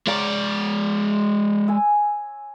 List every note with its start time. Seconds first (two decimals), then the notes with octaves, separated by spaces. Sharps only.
0.07 G#3 C#5 D5 F5 A#5
1.68 G#5 E6